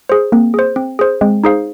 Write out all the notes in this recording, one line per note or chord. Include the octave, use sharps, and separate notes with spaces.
G#4 C5
A#3 C4
G#4 C5
C4
G#4 C5
G#3 C4
D#4 G#4 C5 F5